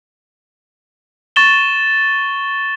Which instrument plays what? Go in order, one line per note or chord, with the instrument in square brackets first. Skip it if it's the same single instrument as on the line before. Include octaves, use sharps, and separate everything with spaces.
[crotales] C#6 A6 E7 G7